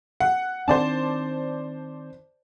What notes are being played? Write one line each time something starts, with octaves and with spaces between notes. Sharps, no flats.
F#5
D#3 C4 D4 C5 D5 A5